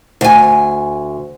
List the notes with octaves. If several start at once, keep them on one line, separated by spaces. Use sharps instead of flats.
D2 G#5